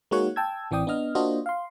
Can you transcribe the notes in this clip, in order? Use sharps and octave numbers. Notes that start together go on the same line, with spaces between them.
G#3 A#3 D#4 F#4 C#5 F#5
G5 A5 E6 G#6
A1 E3 C4 D5 G5 D#6
B3 D4 D#5 F6
A#3 D4 F4 F#4 C5 D#5
F5 C6